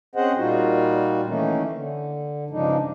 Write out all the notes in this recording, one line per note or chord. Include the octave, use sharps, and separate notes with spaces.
C4 C#4 G#4 C5 D#5 F#5
A#2 G3 D#4 F4 F#4
D#3 E3 A3 A#3 C#4 D#4
D3
G2 C#3 F3 G#3 D4 D#4